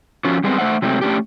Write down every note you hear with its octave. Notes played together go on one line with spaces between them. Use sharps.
F3 C#4 F4 F#4
G3 G#3 B3 C4
A3 C5 E5 F#5
C3 F#3 G#3 A3 C4
A3 C#4 D4 G4